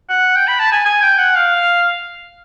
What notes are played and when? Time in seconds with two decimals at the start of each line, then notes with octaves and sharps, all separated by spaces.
0.10 F#5
0.36 G5
0.48 B5
0.60 A5
0.72 G#5
0.86 G#5
1.02 G5
1.18 F#5
1.36 F5